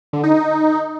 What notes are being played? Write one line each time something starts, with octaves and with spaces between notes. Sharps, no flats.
D3
D#4
D#4